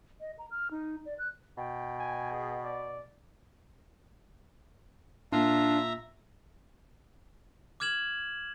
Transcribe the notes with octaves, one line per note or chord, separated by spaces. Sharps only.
D#5
A#5
F6
D#4
D5
F#6
B2 G5
G#5
G#4
D5
A#2 D4 F4 E5 A#5
D6 F6 G#6 E7 F#7